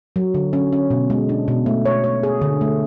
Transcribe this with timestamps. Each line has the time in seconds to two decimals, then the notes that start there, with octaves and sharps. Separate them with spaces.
0.16 F#3
0.34 D3
0.53 C#4
0.73 C#4
0.90 B2
1.10 G#3
1.29 D4
1.48 B2
1.66 A3
1.86 C#5
2.04 C#5
2.23 G#4
2.42 D3
2.61 A3